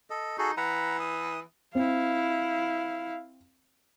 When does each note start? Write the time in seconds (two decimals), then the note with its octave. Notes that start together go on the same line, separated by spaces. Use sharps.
0.10 A4 D#5
0.38 D#4 F#4 G#4 A4
0.57 E3 F#5 A#5 B5
1.00 D#6
1.75 C4 E4 F5